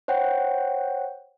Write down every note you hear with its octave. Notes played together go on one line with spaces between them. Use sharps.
C5 C#5 F#5 G5